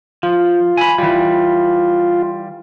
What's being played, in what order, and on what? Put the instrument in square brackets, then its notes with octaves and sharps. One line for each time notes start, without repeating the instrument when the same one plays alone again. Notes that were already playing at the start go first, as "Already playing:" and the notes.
[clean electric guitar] F3 [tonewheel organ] F4
[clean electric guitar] G#5 B5
[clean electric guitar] E3 G3 [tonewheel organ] F4